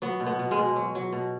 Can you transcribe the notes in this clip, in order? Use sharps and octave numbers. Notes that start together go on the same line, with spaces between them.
F#3 B3
B2
B3
B2
G#3
B2
F#3
F#3
B2